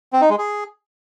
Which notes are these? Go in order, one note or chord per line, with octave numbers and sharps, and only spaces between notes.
C4
D#4
G#3
G#4